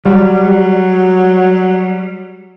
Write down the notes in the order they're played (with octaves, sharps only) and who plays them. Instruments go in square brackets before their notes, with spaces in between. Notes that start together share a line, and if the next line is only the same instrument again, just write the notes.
[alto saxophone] F#3 [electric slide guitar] G3